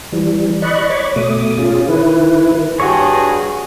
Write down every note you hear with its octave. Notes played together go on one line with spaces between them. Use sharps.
E3 G3
D5 D#5 B5 C#6 F#6
C#5 B5 C#6 D6
B2 A3 D6 D#6
C#4 F4 G#4
D#3 E4 B4
G2 F#4 G#4 C#5